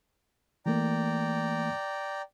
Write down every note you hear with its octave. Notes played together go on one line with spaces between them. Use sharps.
E3 A3 A#3 D5 G5 A#5